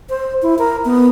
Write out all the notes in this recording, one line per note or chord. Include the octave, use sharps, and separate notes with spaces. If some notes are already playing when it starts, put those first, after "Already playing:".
C5
E4
A#4
B3